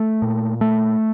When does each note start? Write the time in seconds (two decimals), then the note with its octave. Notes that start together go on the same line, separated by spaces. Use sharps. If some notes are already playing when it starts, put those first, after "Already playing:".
Already playing: A3
0.22 A#2
0.61 A3